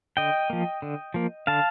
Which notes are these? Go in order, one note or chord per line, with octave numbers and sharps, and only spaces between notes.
D3 D#5 G5
F3 A#3
D3
F3 A#3
D3 F5 A5